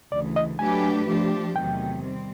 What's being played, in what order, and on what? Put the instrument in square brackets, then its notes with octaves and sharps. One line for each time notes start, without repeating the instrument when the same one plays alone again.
[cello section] D2 C#3 E3 [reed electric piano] D5
[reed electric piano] D#5
[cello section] F#3 A3 D4 G4 B4 [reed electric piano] G#5
[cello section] F3 A3 D4 G4
[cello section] E2 C3 D#3 F#3 A3 [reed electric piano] G5
[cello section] G3 C4